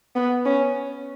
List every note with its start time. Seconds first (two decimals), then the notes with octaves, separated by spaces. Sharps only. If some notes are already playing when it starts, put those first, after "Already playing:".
0.16 B3
0.46 C#4